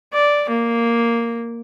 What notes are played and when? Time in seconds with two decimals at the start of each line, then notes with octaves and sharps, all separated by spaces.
0.13 D5
0.50 A#3